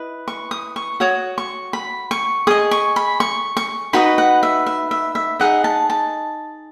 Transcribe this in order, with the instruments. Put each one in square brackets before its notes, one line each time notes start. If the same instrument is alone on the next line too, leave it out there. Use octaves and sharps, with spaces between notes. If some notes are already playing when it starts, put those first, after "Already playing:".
Already playing: [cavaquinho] E4 B4 D#5
C#6
D#6
C#6
F#4 C#5 D#6
C#6
B5
C#6
G#4 D#5 D#6
C#6
B5
C#6
C#6
D#4 F#4 B4 D#5 B5
F#5
E5
E5
E5
E5
D#4 G#4 D#5 F#5
A5
A5